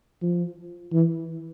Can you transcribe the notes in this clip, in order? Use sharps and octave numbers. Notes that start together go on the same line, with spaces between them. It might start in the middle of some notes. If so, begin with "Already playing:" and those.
F3
E3